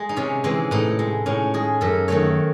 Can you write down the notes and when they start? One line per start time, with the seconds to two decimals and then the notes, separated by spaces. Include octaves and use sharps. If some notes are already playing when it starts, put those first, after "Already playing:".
Already playing: G#3 G#4
0.09 D#4
0.16 C3 C#4
0.44 E3 G#3 C4
0.71 A2 D#4
0.99 G#3
1.26 A2 C#4
1.54 G#3 G#4
1.81 F#2 A4
2.08 D#3 F#3 A3 C#5